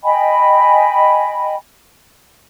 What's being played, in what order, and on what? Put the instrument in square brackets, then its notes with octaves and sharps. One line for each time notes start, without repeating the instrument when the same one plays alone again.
[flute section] D#5 G5 G#5 B5